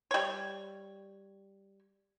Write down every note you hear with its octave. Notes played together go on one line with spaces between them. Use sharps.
G3 C#5